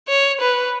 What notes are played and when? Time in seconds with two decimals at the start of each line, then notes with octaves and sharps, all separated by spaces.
0.09 C#5
0.41 B4